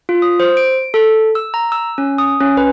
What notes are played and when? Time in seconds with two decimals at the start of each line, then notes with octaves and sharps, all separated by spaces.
0.09 F4
0.22 D#6
0.40 C5
0.57 D7
0.94 A4
1.35 E6
1.54 A#5
1.72 E6
1.98 C#4
2.18 D#6
2.40 C#4
2.57 B4